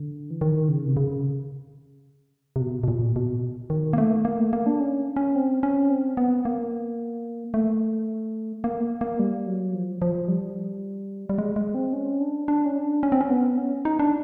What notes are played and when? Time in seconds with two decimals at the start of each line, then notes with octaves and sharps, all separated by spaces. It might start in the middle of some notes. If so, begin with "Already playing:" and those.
Already playing: D3
0.31 E3
0.41 D#3
0.69 C#3
0.86 C3
0.97 C#3
2.56 C3
2.61 B2
2.83 B2
2.88 A#2
3.16 B2
3.70 D#3
3.93 A#3
3.98 A3
4.25 A#3
4.40 A3
4.53 A#3
4.66 D4
4.80 C#4
5.16 C#4
5.35 C4
5.63 C#4
5.89 C4
6.17 B3
6.45 A#3
7.54 A3
8.64 A#3
9.01 A#3
9.19 G3
9.47 F#3
9.74 F3
10.02 F3
10.28 G3
11.29 G3
11.38 G#3
11.56 G#3
11.75 C4
11.93 C#4
12.21 D4
12.48 D4
12.65 C#4
12.76 D4
13.03 C#4
13.12 C4
13.21 C#4
13.30 B3
13.58 C#4
13.85 D#4
13.99 D4